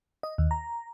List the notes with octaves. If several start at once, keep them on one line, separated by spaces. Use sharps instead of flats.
D#5
D#2
A#5